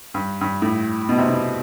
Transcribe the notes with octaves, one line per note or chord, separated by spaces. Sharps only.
G2
G2
A2
B2
C3
B2